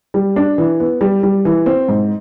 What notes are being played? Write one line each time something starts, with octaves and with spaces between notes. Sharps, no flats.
G3
D4
E3
B3
G3
G3
E3
C4
G#2